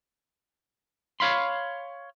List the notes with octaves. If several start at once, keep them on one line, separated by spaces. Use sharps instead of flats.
C#5 F5 B5 C6